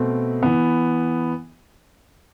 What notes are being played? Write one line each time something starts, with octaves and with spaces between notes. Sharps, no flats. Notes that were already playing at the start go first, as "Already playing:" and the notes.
Already playing: B2 A3 C4
E3 B3